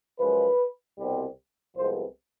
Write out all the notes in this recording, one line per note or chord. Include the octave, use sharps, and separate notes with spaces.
F#2 C#3 F3 G#3 B4
C2 B2 G3 C4
C2 C3 F3 G#3 B3 C5